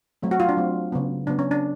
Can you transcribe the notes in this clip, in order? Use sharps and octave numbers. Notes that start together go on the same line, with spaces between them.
F#3 A3 C4
F#4
F4
D4
F#3 A3 C4
C#3 F#3 B3
C#3 F#3 B3 D4
C#4
D4